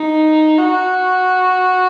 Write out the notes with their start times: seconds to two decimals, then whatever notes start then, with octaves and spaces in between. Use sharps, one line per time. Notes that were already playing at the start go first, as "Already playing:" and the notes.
Already playing: D#4
0.58 F#4